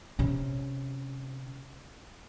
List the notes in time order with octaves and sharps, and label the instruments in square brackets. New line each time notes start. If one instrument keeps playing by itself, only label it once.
[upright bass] C3 C#4